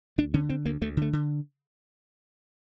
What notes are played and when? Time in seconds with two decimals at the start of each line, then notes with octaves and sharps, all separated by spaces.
0.18 D2 D4
0.34 D3 C#4
0.49 D3 C4
0.65 D2 A#3
0.81 D2 A3
0.97 D3 A3
1.13 D3